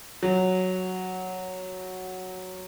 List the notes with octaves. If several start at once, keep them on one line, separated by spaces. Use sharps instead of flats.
F#3